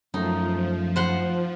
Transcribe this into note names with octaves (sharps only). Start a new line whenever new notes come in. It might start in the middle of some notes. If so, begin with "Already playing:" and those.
F#2 F3 A3 D#4
C5 F#5 C6